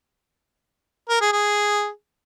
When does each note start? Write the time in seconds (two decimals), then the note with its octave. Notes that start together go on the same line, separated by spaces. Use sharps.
1.09 A#4
1.21 G#4
1.32 G#4